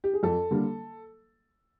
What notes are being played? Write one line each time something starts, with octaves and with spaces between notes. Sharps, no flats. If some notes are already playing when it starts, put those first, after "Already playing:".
G4
G#4
F2 A4
D3 G3 A#3